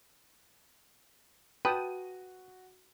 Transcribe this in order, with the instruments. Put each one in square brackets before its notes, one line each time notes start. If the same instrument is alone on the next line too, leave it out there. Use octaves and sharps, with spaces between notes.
[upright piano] F#4 D#7 [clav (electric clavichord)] B4 [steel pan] G5 A5 D#6